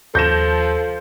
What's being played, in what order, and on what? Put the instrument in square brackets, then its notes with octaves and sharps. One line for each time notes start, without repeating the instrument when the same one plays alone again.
[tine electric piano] D#2 [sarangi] F3 [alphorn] A4 [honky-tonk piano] G6 A#6 E7